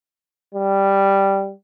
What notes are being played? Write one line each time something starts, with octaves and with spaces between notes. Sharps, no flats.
G3